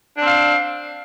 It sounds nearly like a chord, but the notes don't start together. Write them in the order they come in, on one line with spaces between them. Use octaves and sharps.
D4 C4 F5